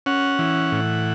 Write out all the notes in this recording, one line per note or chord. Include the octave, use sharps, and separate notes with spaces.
C#4 F#5
E3
A2